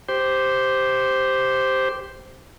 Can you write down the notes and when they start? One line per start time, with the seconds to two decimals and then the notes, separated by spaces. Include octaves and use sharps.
0.09 G4 C5